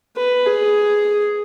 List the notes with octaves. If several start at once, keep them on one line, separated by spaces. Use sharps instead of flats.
B4
G#4